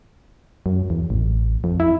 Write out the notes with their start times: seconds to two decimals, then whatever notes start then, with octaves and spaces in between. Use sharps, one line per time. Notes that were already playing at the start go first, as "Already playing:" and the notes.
0.66 F#2
0.90 E2
1.10 A1
1.64 F2
1.80 E4